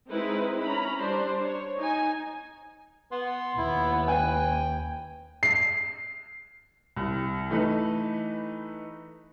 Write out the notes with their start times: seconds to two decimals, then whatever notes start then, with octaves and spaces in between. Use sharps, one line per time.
0.10 G#3 C4 D#4 E4 A#4 B4
0.63 C#4 A#5 B5
0.99 G3 D4 C5
1.42 C#5
1.78 D#4 G#5
3.12 B3 C6
3.57 D#2 E4
4.08 B4 G5 G#5
5.43 C7
6.97 C2
7.50 E3 A3 D#4 B4